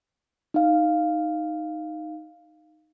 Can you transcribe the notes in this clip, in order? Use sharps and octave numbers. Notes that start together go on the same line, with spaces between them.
D#4 F5